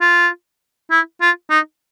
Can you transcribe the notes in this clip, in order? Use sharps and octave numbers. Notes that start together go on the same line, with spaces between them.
F4
E4
F4
D#4